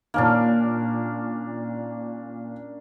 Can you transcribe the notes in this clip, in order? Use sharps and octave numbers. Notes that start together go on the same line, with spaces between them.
A#2 D#3 A#3 C#4 D4